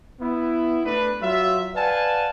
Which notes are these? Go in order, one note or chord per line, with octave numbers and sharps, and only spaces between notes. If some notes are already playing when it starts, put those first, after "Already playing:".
B3 E4
A3 D4 B4
F#3 F4 E5
B4 D5 F5 F#5 G#5 A5